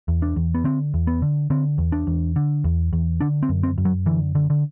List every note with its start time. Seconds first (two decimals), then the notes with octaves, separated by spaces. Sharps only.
0.08 E2
0.22 D4
0.36 E2
0.55 B3
0.64 D3 C4
0.94 E2
1.07 B3
1.22 D3
1.50 D3 C4
1.78 E2
1.92 D4
2.07 E2
2.36 D3
2.64 E2
2.93 E2
3.21 D3 D4
3.43 C4
3.49 F#2
3.63 C4
3.78 F#2
3.85 F#3
4.06 D3 E3
4.35 D3
4.50 D3